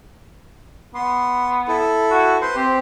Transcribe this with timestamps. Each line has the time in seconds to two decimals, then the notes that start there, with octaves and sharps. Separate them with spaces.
0.95 B3 C6
1.68 E4 A4
2.11 F#4
2.42 B4 C5 C6
2.56 C4 G4